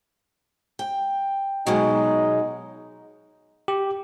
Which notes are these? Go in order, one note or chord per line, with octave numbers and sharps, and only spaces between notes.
G5
B2 F#3 G#3 D#4
G4